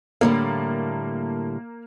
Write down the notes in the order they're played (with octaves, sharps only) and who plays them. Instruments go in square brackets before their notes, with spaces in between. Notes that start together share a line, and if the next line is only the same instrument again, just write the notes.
[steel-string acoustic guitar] A2 D3 G3 [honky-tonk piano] A#3